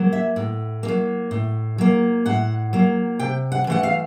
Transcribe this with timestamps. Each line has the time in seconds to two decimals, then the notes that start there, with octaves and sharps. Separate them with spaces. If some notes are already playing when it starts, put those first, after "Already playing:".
Already playing: F#3 A#3
0.12 E5
0.36 A2
0.83 A#3
0.88 F#3
1.31 A2
1.78 F#3 A#3
2.26 A2 F#5
2.73 F#3 A#3
3.19 C3 G5
3.52 F#5
3.67 E3 A3 F#5
3.83 F5